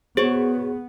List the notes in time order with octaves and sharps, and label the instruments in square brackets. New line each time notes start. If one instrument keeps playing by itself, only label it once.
[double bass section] B3 [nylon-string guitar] F#4 C5 C#5 [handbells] G#4